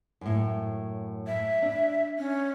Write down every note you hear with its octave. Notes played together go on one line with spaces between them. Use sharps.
F#2 A2
E5
D4
C#4